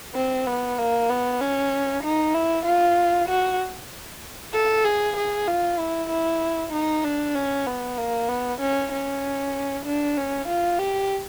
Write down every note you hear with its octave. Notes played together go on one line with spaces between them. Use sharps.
C4
B3
A#3
B3
C#4
D#4
E4
F4
F#4
A4
G#4
G#4
F4
E4
E4
D#4
D4
C#4
B3
A#3
B3
C#4
C#4
D4
C#4
F4
G4